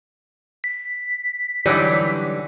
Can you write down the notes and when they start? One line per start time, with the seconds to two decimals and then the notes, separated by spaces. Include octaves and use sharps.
0.64 B6
1.66 D3 E3 F#3 G3 D#4 G4 D5